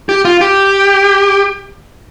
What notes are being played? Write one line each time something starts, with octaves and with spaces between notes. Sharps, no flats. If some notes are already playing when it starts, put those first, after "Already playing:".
G4
F4
G4